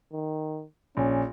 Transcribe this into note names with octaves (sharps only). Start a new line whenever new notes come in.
D#3
A#1 C#4